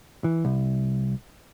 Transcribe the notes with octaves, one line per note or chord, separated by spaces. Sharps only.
E3
C2